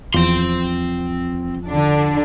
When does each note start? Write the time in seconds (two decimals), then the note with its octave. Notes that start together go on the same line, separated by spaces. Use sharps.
0.14 E2 F3 C4 F4 C6
1.67 D3 D4